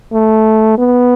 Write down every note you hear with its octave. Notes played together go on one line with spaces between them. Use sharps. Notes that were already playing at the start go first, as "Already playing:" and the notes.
A3
B3